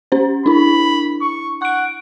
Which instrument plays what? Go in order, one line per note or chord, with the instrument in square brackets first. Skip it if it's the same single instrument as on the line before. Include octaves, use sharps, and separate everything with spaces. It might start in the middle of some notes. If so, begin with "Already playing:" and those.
[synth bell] C#4 C5
[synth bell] D4 E4 [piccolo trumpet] B5
[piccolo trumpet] C#6
[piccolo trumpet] F#5 [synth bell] C#6 D7